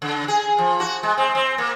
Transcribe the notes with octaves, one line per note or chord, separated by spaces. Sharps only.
C#3
G#4
F3
F#4
G#3
C4
C4
A#3